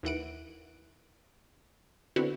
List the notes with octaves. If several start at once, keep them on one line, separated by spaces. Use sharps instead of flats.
D#2 E3 F#5 D7
D3 B3 C4 E4 F#4